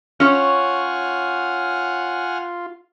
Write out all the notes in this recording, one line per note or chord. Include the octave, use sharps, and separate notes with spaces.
C#4 F4 C#5 F#5 G#5 F6